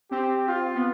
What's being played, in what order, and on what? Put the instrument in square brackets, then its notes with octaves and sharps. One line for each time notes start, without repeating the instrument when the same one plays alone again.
[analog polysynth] C4 [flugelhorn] G4
[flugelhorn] F4
[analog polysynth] B3